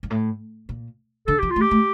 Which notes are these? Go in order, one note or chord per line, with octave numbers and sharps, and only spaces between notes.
G2
A2
A#2
D3 A4
F3 G4
F4
A3
G4
A3